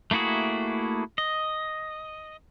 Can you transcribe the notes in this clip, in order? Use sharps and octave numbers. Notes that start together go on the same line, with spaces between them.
A3 A#3 E4 F#4 G#4
D#5